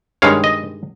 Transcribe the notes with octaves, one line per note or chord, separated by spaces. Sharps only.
G2 D#3 G#3 C#5 F5
D#5